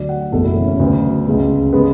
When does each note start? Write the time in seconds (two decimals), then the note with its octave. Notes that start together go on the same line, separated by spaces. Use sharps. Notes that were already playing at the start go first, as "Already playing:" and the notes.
Already playing: D2 D3 F#3 D5
0.09 F#5
0.32 F#1 E2 B2 A3 A4
0.44 E4
0.56 C#4
0.68 C#4
0.79 D2 C#3 F#3 B3
1.26 C#2 C#3 G#3 B3
1.73 C#3 G#3 B3